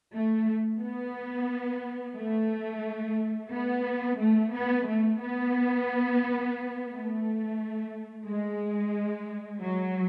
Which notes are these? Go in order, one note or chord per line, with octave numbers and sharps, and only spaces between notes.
A3
B3
A3
B3
A3
B3
A3
B3
A3
G#3
F#3